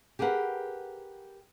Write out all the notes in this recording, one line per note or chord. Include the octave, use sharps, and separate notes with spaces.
G4 G#4 A#4 B4 F#5